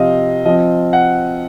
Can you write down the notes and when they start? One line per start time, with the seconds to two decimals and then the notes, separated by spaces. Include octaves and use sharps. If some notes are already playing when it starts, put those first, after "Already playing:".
Already playing: C3 F3 C4 D#5 F5
0.45 F3 D#5
0.48 C4
0.93 F#5